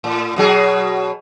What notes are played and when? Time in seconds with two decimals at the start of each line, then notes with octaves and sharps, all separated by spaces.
0.04 A2
0.36 B2 F#3 G#4